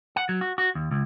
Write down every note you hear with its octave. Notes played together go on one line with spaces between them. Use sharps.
F#5
F#3
F#4
F#4
D#2
C#2